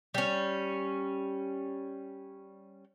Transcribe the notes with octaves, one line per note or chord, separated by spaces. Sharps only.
G3 C#4